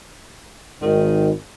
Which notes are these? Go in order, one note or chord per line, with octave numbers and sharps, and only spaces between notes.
G#1 D#3